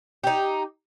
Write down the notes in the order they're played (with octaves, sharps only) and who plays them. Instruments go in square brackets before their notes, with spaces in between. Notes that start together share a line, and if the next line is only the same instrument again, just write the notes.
[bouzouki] D#4 G4